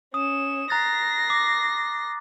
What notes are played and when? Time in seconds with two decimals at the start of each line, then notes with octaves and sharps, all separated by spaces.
0.14 C#4 D#6 E7
0.70 A#5 F#6 A6 A#6 C7
1.30 D6